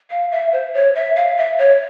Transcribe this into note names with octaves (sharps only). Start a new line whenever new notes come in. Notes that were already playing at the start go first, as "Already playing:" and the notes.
F5
E5
C5
C#5
E5
F5
E5
C#5